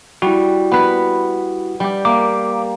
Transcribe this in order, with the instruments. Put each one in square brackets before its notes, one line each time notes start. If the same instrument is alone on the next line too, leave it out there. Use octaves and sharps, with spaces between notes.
[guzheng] G3 [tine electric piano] E4 F#4
[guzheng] B3 B4
G3 G4
[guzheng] A#3 [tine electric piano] D6